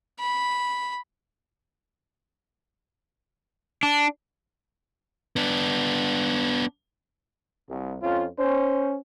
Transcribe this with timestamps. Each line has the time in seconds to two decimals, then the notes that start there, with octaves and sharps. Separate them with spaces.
0.19 B5
3.83 D4
5.36 B3 D4
7.69 C2
8.02 F2 C#4 F4
8.38 C#4 C5